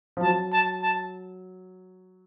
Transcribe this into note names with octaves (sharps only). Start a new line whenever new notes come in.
F3
F#3 A5
A5
A5